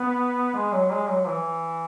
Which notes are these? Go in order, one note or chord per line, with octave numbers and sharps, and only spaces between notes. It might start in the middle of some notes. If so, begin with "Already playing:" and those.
Already playing: B3
G#3
F#3
G#3
F#3
E3